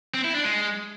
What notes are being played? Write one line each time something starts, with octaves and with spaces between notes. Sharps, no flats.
C4
E4
D4
G#3